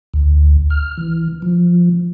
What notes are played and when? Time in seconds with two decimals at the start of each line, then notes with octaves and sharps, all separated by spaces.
0.14 D2
0.70 F6
0.97 E3
1.42 F3